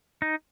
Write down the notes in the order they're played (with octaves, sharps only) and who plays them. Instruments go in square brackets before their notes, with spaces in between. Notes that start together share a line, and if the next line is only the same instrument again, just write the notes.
[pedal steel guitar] D#4